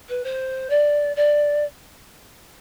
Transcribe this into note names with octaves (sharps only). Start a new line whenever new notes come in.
B4
C5
D5
D5